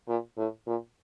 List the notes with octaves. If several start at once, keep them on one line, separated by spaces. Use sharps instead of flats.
A#2
A2
A#2